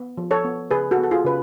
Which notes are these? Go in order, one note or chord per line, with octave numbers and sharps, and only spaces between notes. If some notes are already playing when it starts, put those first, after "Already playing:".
Already playing: B3
F3
A4 C#5
B3
C#3 G#4 B4
F#4 A4
B3
A4
F4 G#4
C#3 B4